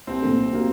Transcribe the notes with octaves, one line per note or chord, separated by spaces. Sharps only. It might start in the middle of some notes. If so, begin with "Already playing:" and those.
C2 C4
A#2 A3
C2
C3 F#3 A#3